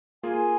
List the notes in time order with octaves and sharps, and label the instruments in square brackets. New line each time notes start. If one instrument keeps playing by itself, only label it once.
[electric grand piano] A#3 F4 G#4 [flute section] G#5